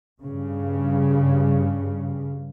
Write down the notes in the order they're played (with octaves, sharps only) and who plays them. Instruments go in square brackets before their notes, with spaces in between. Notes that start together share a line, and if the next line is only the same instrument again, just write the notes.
[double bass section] G2 C#3